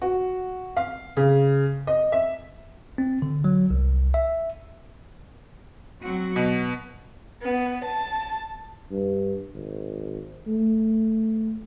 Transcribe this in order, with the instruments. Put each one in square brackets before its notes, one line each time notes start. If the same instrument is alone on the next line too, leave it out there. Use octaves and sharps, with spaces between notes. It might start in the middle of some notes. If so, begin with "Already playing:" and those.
[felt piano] F#4
F5
C#3
D#5
E5
[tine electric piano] C4
D3
F#3
C2
E5
[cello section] F#3 C4 F#4
[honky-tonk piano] B2 [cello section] B3
[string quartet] B3
A5
[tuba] G2
G#1
A3